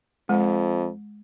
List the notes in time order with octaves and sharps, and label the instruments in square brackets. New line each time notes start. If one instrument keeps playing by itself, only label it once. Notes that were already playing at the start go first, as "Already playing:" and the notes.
[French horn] F2 [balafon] G#3